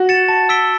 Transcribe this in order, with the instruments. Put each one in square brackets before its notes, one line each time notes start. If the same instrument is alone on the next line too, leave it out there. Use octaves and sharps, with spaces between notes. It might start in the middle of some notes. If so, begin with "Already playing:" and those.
Already playing: [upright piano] F#4
[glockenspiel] A6 C#7 E7
A5
E6 B6 D7 G7